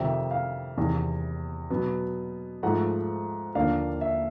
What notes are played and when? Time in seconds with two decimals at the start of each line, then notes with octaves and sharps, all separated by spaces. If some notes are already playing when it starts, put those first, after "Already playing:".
Already playing: F2 C3 D#3 G3 E5
0.31 F5
0.77 E2 C3 D#3 G3
1.70 B2 F#3 B3
2.63 G#2 F3 A3 F#5
3.55 D#2 D3 F3 A#3 D4 F5
4.01 E5